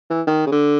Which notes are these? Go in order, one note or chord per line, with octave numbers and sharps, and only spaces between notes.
E3
D#3
C#3
D3